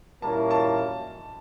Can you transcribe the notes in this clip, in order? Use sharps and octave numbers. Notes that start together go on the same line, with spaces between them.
A#2 G3 A#3 C#4 E4 A5
A5